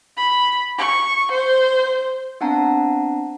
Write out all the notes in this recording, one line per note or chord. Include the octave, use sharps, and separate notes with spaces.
B5
C#6
C5
B3 C4 D4 F#5 A5 A#5